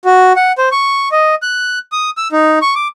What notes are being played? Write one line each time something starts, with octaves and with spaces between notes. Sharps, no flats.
F#4
F#5
C5
C#6
D#5
F#6
D#6
E6
D#4
C#6
D6